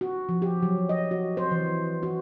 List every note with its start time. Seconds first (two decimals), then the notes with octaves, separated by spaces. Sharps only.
0.01 F#4
0.29 F3
0.42 G4
0.63 F#3
0.89 D#5
1.11 F#4
1.37 C5
1.51 E3
2.03 F#4